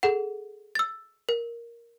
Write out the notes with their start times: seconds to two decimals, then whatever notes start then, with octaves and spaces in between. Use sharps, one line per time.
0.03 G#4 A4 F#5
0.75 E6 A6
1.29 A#4